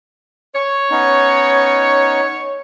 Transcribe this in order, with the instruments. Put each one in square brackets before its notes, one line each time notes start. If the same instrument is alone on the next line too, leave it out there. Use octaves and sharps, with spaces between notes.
[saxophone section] C#5
[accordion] B3 C#4 D#4